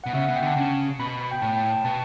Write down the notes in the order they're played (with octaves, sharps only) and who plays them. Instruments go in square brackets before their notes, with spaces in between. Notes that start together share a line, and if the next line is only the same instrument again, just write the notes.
[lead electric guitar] B2 [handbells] F#5
[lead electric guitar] C#3 [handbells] E5
[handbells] F#5
[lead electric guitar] B2
[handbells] G5
[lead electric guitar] D3 [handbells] A5
[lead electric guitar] C#3
[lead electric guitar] B2 [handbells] B5
[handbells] B5
B5
G5
[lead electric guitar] A2 [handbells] A5
[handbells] G5
A5
[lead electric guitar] B2 [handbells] A5